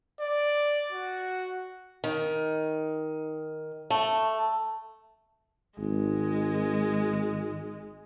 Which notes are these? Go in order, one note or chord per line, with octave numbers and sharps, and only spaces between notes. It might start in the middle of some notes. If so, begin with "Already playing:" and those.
D5
F#4
D#3
A3
G#1 G#3